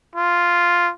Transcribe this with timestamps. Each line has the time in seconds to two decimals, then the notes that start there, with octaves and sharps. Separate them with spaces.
0.15 F4